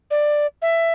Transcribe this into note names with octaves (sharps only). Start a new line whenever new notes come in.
D5
E5